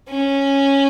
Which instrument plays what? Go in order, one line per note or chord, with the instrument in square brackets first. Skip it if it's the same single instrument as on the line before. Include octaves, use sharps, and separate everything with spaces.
[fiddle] C#4